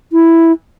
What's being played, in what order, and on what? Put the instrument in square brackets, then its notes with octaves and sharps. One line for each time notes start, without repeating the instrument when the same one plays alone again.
[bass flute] E4